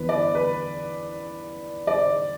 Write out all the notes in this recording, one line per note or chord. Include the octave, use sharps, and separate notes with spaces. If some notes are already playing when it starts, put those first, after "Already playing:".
Already playing: E2 E3 B3 D4 B4
D5
B4
D5